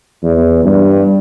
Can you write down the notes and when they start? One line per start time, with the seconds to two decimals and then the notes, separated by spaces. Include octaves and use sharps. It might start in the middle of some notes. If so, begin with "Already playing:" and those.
0.23 E2
0.65 G2